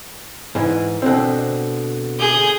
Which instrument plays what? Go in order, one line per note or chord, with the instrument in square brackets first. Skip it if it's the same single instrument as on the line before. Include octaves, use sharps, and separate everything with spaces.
[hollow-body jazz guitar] G#2 E3
B2 D3 C4
[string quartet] G#4 G6